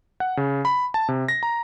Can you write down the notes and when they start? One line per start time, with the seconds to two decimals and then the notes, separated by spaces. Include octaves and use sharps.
0.20 F#5
0.37 C#3
0.65 B5
0.94 A5
1.09 C3
1.28 A#6
1.43 A#5